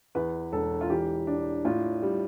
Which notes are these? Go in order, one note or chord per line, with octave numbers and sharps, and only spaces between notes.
E2 B4
E1 A4
F4
E3 G4
D4
A2 F4
G3